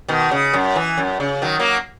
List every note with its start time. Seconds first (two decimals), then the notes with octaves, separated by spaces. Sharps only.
0.08 B2 D#3
0.31 C#3
0.53 F#2
0.76 E3
0.98 F#2
1.20 C#3
1.42 D#3 F#3
1.59 F#3 A#3